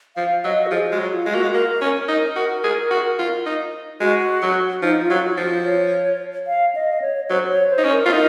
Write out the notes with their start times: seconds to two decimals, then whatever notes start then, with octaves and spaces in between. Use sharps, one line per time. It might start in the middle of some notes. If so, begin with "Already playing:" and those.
0.16 F3 F5
0.44 F#3 D#5
0.67 F#4
0.71 F3 G#4
0.91 G#3 F#4
0.99 F#3
1.12 F4
1.26 G#3
1.33 A#3 F#4
1.43 G#3
1.54 A#3 A#4
1.82 C#4
1.94 A#4
2.08 D#4
2.36 F#4
2.64 G#4
2.91 F#4
3.19 F4
3.46 D#4
4.00 G#3 F#4
4.42 F#3
4.82 F3 D#4
5.03 F4
5.10 F#3
5.24 F#4
5.37 F3
5.45 F4
5.64 C#5
6.47 F5
6.75 D#5
6.90 D#5
7.02 C#5
7.29 F#3 C5
7.50 C#5
7.70 C5
7.78 D#4
7.84 C#4
7.92 A#4
8.06 F4
8.12 D#4